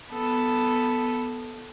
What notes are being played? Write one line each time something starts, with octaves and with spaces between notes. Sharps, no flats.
B3 A4